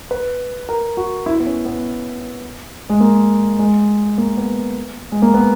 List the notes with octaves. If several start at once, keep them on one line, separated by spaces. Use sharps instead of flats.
B4
A#4
F#4
E4
B3
C#4
B3
G#3
A#3
G#3
A#3
B3
G#3
A#3
B3